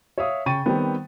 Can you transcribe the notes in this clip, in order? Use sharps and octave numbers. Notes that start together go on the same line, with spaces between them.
C#5 E5 F5 D#6
C#3 G5 C#6 A6 D#7
D#3 G3 B3 C4